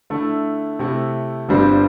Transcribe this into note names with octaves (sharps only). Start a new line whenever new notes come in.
D3 A3 E4 A4
C3 A3 E4
G1 G2 D3 G3 C4